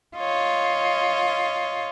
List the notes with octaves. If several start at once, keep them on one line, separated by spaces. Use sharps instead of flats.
F4 C#5 D#5